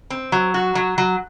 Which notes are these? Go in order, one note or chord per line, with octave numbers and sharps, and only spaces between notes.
C4
F#3
F#4
F#3
F#3